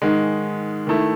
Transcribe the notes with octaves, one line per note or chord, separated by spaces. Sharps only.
G#2 D#3 G#3
D#3 A3 E4